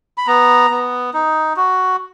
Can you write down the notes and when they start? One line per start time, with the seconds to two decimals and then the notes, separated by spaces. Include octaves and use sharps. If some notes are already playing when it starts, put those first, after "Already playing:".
0.18 B5
0.27 B3 A#5
0.71 B3
1.14 D#4
1.57 F#4